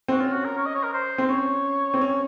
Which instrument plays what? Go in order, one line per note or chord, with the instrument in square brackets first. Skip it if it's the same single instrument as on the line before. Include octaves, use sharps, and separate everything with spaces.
[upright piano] C4 [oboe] F#4
[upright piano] C#4 [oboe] F4
[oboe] F#4
A#4
C#5
D#5
C#5
A#4
C5
[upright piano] C4 [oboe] C5
[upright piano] C#4 [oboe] C#5
[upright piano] C4
C#4